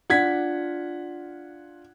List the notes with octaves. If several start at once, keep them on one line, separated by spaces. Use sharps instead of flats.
D4 F4 F#5 G#6 B6